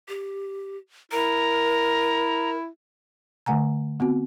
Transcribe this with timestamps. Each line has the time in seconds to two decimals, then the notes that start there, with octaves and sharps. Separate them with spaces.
0.09 G4
1.12 E4 A#4 A#5
3.46 D3 A3 F#5 G#5 A#5
4.00 B3 C4 F#4